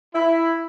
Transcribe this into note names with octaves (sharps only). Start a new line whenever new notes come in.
E4